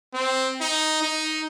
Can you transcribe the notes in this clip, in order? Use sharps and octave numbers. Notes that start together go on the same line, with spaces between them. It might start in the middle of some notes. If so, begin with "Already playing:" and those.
C4
D#4
D#4